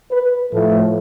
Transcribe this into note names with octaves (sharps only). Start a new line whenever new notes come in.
B4
A2 F3 A3